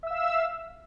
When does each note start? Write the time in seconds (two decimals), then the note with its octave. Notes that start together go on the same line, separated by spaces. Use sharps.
0.03 E5
0.07 E6
0.11 F5